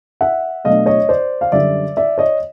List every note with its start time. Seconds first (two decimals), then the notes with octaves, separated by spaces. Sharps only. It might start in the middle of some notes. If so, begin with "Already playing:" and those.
0.21 E5 F#5
0.65 B2 F#3 A3 D4 D#5 F5
0.86 C#5 D#5
1.09 C5 D5
1.41 F5
1.52 F#2 D3 G3 D5 E5
1.97 D5 E5
2.18 C#5 D#5